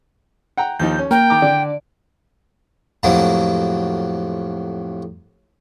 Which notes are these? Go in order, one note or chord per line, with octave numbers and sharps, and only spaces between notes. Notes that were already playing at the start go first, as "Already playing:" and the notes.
F#5 G5 A#5
D#2 F3 D#4 G6
C#4
A#3 A#4 G5
D#3 A#5 D6
D3 D5
F2 A2 C3 F#3 A#3